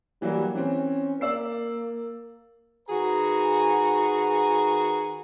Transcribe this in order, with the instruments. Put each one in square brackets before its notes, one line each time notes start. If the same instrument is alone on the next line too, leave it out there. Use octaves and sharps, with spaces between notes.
[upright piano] E3 F#3 A#3 [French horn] G3
[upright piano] E3 C4 [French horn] C#4
[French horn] A#3 [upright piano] D5 E6 C7
[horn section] D#3 F#4 G#4 B4 A#5